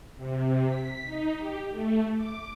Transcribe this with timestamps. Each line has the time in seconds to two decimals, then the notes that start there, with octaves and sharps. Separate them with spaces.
0.17 C3
0.64 B6
1.05 D#4
1.37 G4
1.70 A3
2.15 D6